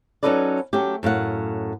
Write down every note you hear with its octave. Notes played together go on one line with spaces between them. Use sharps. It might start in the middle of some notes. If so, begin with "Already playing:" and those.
F#3 C#4 D#4 A4 B4 D5
F#3 A3 C#4 G4
F#2 A2 F5 F#5